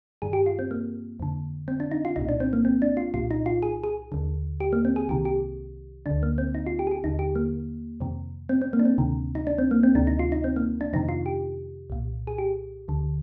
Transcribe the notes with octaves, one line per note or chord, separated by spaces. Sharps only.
G2 D#3 G#4
G4
F4
C4
A#3
F2 D3
C4
D4
D#4
F4
C2 A#2 D#4
D4
C4
A#3
C4
D4
F4
C2 A#2 F4
D#4
F4
G#4
G#4
D#2 D3
G4
A#3
C4
G#4
C2 C3 D#3 G4
G4
D2 D3 D4
A#3
C4
D#4
F4
G4
G#4
G4
D#2 D3 D#4
G4
A#3
F2 C3 D#3
C4
C4
A#3
D4
C4
D2 C3 D#3
D#4
D4
C4
A#3
C4
D2 C3 D#3 D4
D#4
F4
D#4
C4
A#3
D4
F2 C3 D#3 D#4
F4
G4
C2 A#2
G#4
G4
D2 D3